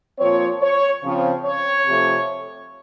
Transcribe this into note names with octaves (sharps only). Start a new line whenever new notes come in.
A#2 F3 C4 C#5
C#5
C#3 F3 C4
C#5
C3 F3 A3